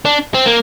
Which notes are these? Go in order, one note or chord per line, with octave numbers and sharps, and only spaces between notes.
D4
C4
A#3